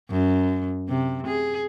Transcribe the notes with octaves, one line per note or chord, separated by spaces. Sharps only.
F#2
C3
G#4